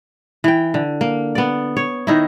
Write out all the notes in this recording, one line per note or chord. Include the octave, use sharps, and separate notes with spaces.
E3 G5
D3
A#3
B3 D5
C#5
D#3 D#4 E4